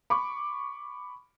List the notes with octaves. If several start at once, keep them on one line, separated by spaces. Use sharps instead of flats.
B5 C#6 D6